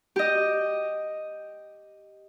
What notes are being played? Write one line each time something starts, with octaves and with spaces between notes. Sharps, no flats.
G4 D#5